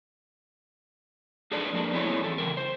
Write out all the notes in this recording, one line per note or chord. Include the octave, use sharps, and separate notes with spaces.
D4 G#4 A4 B4 D5
F2 A#3 D4
B3 C4 E4 G#4 A4 C#5
E2 A4
C#3 E3 A#4
C5